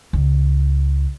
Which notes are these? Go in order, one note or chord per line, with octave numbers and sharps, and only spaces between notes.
C#2